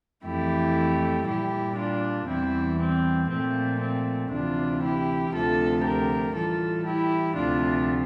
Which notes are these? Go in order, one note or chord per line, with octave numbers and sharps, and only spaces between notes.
F2 E3 A3 E4 G4
A#2 G3 E4 G4
D4 F4
E2 E3 G3 C4 E4
C4
A#2 F3 A3 C4
C4
D2 C3 E3 D4 F4
E4 G4
D2 C3 F3 A3 F4 A4
G4 A#4
A2 E3 G3 F4 A4
E4 G4
D2 C3 F3 A3 D4 F4